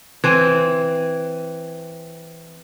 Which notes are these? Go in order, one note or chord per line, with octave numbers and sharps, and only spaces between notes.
E3 C4